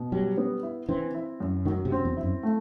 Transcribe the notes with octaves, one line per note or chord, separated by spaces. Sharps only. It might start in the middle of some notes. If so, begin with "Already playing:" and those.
Already playing: B2
F#3 G3
B3
E4
E3 C4
E4
F#2
D#3 F#3
C3
C4
E2
E4
F#2
A3